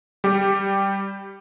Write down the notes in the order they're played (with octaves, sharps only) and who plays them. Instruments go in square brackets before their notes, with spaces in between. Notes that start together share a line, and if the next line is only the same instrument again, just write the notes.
[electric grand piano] G3 G4